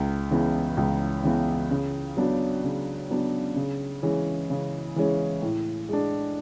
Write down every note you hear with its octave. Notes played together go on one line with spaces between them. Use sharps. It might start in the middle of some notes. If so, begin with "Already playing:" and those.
Already playing: C#2
C#3 E3 B3
C#2
C#3 E3 B3
C#3
F#3 B3 D4
C#3
F#3 B3 D4
C#3
E3 G#3 C#4
C#3
E3 G#3 C#4
A2
G#3 D4